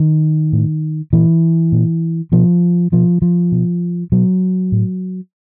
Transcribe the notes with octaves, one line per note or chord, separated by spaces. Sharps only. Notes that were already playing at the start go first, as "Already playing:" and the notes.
Already playing: D#3
A2
A#2 E3
A#2
B2 F3
B2 F3
F3
B2
B2 F#3
A2